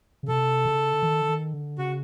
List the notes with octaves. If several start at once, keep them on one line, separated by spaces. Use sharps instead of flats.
C#3
C3 A4
C#3
D3
D#3
D3
D#3
D3
C#3 F#4